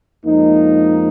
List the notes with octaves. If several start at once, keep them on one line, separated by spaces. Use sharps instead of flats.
F2 F3 G#3 A#3 D#4